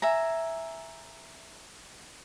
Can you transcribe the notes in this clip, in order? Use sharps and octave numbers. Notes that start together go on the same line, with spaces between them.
E5 G#5 A#5